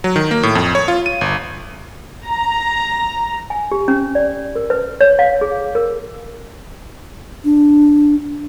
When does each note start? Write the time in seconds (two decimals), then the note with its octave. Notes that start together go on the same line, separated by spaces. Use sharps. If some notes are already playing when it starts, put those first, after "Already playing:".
0.04 F#3
0.16 D#3
0.31 A#3
0.43 A2
0.55 F2
0.75 C#5
0.88 F4
1.06 D#7
1.21 G1
2.25 A#5
3.50 G#5
3.71 G4
3.88 C#4
4.15 D5
4.56 A#4
4.70 B4
5.01 C#5
5.19 F5
5.41 G#4
5.75 A#4
7.44 D4